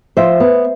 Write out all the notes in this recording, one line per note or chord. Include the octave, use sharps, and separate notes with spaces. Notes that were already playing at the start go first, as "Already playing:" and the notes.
F3 C5 E5
B3